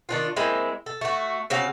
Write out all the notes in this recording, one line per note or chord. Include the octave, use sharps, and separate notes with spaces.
D#3 D4 F4
G#3 A#3 C4 E4
A4
A3 F#4
C#3 C4 F#4 F5